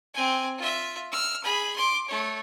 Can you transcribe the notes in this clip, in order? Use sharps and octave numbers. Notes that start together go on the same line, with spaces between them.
C4 G#5
F4 E5
E6 F6
G#4 B5
C6 D6
A3 C#5